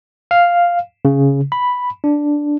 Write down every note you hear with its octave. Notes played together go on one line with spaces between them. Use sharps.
F5
C#3
B5
D4